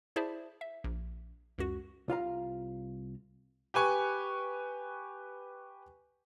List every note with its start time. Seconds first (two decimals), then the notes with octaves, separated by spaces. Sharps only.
0.16 E4 G#4 C5 D5 E5 A5
0.61 E5
0.84 A#1
1.58 C#2 F#2 F#4
2.08 C2 F4 F5 A#5
3.74 G4 B4 G#5 C#6